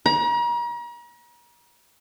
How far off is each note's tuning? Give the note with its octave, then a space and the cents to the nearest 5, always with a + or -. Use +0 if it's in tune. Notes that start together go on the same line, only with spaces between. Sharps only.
A#5 +40